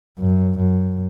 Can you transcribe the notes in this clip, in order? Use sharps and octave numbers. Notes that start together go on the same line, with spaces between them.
F#2
F#2